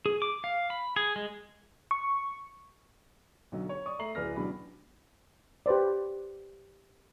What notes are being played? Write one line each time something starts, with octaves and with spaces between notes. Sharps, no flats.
G#4
D6
F5
B5
G#4
G#3
C#6
B1 D3 F#3
C#5
D5 C#6 D#6
A3 E5 A#5 C7 F#7
D1 G#4 B4 D5 F6 A#6
A1 B2 F#3 D4 B5
G4 B4 C5 D5